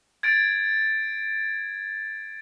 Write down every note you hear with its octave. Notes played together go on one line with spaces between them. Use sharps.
G#6 A6 D7